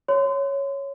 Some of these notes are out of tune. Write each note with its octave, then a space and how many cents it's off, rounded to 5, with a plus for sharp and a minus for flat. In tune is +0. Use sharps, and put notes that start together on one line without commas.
C#5 +0 C6 -30